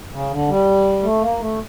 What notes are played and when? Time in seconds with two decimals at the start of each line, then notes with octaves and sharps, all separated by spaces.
0.13 C#3
0.30 D3
0.49 G3
1.03 A3
1.22 A#3
1.40 A3